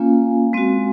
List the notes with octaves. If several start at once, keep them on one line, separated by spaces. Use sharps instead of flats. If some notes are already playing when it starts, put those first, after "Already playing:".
Already playing: A#3 C#4 F4 F5 G#5
G#3 C4 F#4